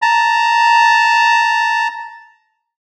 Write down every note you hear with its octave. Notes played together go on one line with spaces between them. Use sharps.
A5 A#5